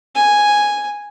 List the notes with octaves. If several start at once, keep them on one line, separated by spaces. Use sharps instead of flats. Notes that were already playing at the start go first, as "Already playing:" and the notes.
G#5